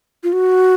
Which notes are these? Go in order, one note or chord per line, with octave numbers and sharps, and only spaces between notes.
F4
F#4